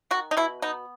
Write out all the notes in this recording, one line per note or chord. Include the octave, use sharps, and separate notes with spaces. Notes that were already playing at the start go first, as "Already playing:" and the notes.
D#3 F#4
D#4
B2 E4
B3 D#4